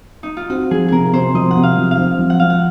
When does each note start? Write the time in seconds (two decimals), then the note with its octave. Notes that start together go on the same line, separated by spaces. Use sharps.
0.23 D#4
0.37 F4
0.50 C4 F#4
0.71 F3 G#4
0.88 C3 G#4 A#4
1.13 C3 C5
1.34 F3 D#5
1.51 F#5
1.57 C3
1.63 F5
1.78 F3
1.91 F5
1.98 C4
2.19 F3
2.30 F#5
2.40 F3 F5
2.50 F#5